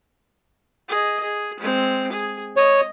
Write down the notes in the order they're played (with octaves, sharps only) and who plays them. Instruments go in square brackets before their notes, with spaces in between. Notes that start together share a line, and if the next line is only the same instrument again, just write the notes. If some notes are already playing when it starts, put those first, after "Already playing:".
[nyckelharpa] G#4 D#5
G#4
G#3 C4
G#4
[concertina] C#5 [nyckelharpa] D#5